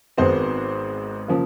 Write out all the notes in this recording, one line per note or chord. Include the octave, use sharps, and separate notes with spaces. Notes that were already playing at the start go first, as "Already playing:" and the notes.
G#1 G#2 D#3 G#3 B3 C4 C5
C#3 F3 A#3